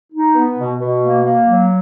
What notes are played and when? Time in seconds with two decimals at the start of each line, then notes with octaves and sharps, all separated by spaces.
0.12 D#4
0.35 B3
0.57 B2
0.80 B2
1.03 A#3
1.25 A#3
1.48 F#3